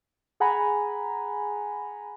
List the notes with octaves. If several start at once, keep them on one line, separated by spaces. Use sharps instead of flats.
G#4 F#5 G#5 A#5 B5